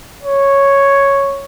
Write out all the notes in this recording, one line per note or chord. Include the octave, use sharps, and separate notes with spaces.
C#5